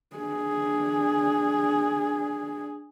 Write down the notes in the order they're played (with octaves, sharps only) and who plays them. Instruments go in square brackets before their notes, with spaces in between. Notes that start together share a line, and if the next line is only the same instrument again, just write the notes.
[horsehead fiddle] D4 G#4